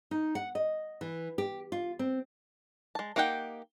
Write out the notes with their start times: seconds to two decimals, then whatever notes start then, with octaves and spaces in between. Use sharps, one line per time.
0.11 D#4
0.35 F#5
0.55 D#5
1.01 E3
1.38 G4
1.72 F4
1.99 C4
2.95 G#3 A5
3.16 A#3 D#4 G4 F#5 G5